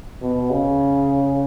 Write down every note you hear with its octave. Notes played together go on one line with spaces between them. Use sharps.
B2
C#3